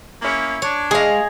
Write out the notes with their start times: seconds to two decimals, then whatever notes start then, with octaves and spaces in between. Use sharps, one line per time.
0.22 A#3 C#4 E4
0.62 D4 C#5
0.91 G#3 G#4 D#5 F5